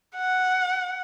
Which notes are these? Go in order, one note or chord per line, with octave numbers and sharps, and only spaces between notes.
F#5